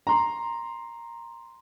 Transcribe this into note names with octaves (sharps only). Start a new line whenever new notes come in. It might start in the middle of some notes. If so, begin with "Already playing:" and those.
A#5 C6